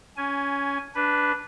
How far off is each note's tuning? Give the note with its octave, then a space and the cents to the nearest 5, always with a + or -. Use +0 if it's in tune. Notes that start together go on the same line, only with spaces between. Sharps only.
C#4 +15 G#5 +0
D4 -10 B4 +0